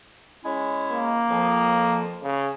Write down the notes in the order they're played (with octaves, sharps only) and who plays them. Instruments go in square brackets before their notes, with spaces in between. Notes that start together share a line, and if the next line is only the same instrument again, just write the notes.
[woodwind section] G#3 C#4 E4
[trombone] A#3
[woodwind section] F2 F3
[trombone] C#3